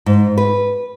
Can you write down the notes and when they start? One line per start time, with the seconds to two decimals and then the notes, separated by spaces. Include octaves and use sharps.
0.06 G#2
0.38 B4